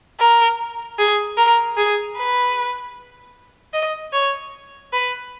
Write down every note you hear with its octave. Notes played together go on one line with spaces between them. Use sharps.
A#4
G#4
A#4
G#4
B4
D#5
C#5
B4